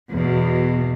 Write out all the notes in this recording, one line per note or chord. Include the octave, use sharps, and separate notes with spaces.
E2 B2